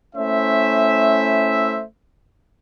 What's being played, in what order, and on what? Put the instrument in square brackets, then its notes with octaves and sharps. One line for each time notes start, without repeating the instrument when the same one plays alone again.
[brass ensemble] A3 C#4 E4 C5 E5